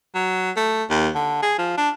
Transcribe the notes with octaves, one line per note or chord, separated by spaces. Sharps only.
F#3
A3
D#2
D3
G#4
F3
D4